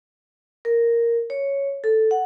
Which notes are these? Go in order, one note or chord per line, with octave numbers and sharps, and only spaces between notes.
A#4
C#5
A4
F#5